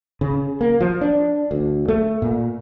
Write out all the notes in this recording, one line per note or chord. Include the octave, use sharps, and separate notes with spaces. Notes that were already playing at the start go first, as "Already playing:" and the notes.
C#3
A#3
F3
D4
D2
A3
A#2